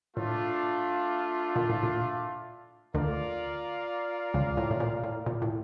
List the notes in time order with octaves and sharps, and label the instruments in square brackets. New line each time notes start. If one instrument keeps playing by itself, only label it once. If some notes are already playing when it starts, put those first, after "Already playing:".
[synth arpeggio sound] A2 [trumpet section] A3 D4 F4
[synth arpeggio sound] A#2
A2
A#2
[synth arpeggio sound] D2 D3 [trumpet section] F4 A#4 D5 F5
[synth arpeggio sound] C#2 C#3
A2
A2
A#2
A2
A#2
A2